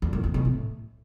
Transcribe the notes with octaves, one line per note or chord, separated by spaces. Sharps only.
E2
F#2
E2
B2
A2